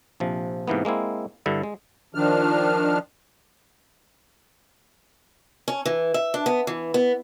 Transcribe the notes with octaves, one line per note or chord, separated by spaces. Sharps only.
A#1 C3 F3
G#2 C3 E3 A#3 B3
G#3 A#3 C4 E4
G2 D3 E4
G#3
D#3 F3 D4 F6
C#4
E3
E5
D4
B3
E3
B3